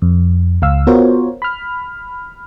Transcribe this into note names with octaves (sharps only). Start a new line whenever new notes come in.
F2
C#2 F5 E6
B3 F4 F#4 A#4 C5 C#5
B5 F6